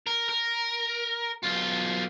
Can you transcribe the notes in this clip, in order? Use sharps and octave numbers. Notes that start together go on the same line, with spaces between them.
A#4
A#4
B1 F4